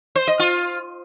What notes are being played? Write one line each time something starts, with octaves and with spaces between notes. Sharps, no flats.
C5
D#5
F4